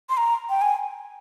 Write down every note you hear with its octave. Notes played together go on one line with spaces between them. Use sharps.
C6
A#5
G5
G#5